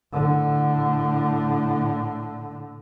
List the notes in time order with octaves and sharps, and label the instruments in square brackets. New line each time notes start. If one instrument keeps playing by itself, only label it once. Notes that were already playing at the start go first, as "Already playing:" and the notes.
[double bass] A2 D3